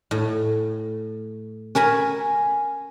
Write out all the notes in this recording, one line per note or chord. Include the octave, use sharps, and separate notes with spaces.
A2
C#4 A#4 G#5 B5